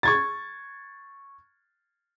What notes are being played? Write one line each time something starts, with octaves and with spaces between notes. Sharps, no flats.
C#6 G#6 A6